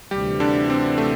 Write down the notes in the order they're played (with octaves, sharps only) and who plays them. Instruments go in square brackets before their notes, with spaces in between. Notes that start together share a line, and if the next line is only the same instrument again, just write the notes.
[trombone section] D2 C3 E3 [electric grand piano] G3 G4
[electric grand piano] D3 D4
C4
A3